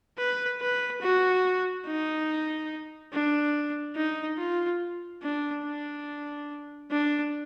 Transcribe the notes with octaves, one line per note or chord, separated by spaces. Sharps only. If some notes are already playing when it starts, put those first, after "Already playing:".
B4
B4
F#4
D#4
D4
D#4
F4
D4
D4
D4